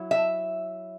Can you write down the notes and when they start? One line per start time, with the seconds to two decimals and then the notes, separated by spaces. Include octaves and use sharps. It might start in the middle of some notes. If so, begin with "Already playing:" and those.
Already playing: F#3 E4
0.11 E5